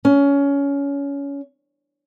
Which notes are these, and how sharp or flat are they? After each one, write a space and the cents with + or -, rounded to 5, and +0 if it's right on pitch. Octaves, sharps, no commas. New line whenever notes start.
C#4 +20